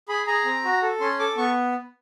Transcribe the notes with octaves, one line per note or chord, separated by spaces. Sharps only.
G#4 B5
G#4 A#5
C4
F#4
A4
C#4 C6
A4 D6
B3 C#6